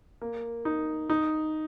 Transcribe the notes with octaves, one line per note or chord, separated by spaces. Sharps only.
A#3
D#4
D#4